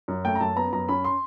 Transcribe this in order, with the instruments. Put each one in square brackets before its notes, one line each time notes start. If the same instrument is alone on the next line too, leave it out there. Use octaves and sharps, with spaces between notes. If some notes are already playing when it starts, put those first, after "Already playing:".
[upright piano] F#2
A3 G5
A#5
F#2 A5
B3 A#5
F#2 A#5
C#4 B5
C6